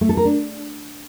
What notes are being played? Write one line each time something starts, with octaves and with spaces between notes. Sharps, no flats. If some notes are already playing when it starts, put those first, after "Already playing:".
A3
A4
A#4
D4